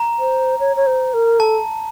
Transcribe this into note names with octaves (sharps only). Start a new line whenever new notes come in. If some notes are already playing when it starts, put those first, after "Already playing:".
Already playing: A#5
C5
C#5
C#5
C5
A#4
A4 A5